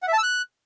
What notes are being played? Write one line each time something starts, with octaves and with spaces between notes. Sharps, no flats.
F#5
E5
A5
E6
F#6